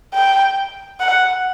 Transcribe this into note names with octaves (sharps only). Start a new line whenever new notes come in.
G5
F#5